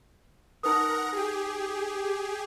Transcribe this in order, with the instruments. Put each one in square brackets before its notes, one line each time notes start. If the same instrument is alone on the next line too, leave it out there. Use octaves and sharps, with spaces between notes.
[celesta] D#4 B4 D#6 [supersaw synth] A#4 F#5 A#5
[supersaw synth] G4 G#4